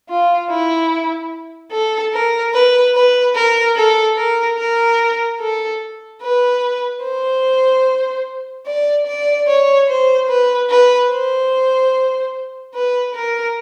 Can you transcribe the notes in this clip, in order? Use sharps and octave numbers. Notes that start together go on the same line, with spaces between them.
F4
E4
A4
A#4
B4
B4
A#4
A4
A#4
A#4
A4
B4
C5
D5
D5
C#5
C5
B4
B4
C5
B4
A#4